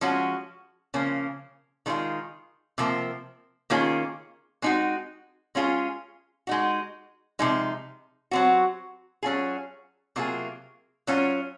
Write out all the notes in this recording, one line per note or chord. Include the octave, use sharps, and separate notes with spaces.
F3 G#3 C#4 F#4
C#3 F3 A#3 C#4
D#3 G#3 C#4 F4 G#4
C3 F3 A#3
D#3 A#3 C#4 F4 G#4
G#3 C4 D#4 F#4
G#3 C#4 F4 G#4
G#3 D#4 F#4
C3 F3 G#3 D#4
F#3 C4 F#4
F#3 C#4 F4 G#4
C3 F#3 A#3 F4 G#4
F#3 C#4 F4